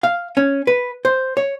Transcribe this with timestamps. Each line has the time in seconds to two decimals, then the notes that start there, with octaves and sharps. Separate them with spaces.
0.03 F5
0.37 C#4
0.67 B4
1.05 C5
1.37 C#5